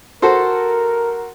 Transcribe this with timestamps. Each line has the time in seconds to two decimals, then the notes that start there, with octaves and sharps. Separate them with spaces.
0.22 F#4 A4 A#4 C5